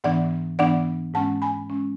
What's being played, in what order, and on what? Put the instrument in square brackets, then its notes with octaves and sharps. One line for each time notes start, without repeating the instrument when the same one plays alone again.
[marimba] G#2 E3 B3 D4 D5 F#5
G#2 E3 B3 D4 D5 F#5
G#2 G#3 C#4 F#5 A5
G#5 B5
G#3 C#4